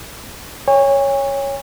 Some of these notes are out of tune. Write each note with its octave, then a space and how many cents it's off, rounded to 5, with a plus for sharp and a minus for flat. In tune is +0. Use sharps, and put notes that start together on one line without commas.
C#5 +0 G#5 -40